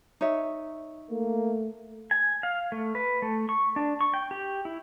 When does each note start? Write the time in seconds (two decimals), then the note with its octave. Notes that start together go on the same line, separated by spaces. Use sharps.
0.21 D#4 C#5 E5
1.11 A3 A#3
2.11 G#5
2.43 F5
2.72 A3
2.95 B4
3.22 A3
3.49 C#6
3.76 D4
4.01 C#6
4.14 G5
4.31 G4
4.65 E4